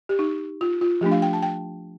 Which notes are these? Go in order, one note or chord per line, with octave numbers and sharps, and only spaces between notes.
G4
D#4
F4
F4
F3 A3 D4 G4
F5
G5
A5
G5